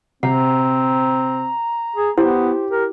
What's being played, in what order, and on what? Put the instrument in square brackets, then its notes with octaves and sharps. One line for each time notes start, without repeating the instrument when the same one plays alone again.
[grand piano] C3 [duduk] C4 [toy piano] F#5 [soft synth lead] A#5
[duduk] G#4
[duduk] B3 [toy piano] E4 [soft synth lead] G4 [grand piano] C5
[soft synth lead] G4 [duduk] A#4